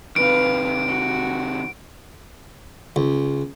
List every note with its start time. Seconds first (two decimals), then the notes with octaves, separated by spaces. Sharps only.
0.16 C3 D#3 B4 F5 D7
0.88 F#4
2.96 C#2